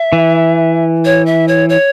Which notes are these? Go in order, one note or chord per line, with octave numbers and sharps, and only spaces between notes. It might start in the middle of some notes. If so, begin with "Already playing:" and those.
Already playing: E5
E3
C#5
E5
C#5
C#5